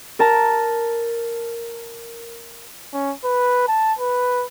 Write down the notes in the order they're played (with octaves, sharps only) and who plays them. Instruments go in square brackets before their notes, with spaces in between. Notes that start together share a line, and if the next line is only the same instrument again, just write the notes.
[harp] A#4 A5 A#5
[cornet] C#4
B4
A5
B4